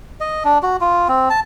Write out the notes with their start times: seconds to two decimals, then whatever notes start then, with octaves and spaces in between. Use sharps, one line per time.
0.20 D#5
0.45 D4
0.63 F#4
0.81 F4
1.08 C4
1.30 A5